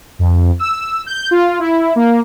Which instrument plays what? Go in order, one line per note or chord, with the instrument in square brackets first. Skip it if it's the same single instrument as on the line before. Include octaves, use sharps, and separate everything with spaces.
[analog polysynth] F2
E6
G6
F4
E4
A#3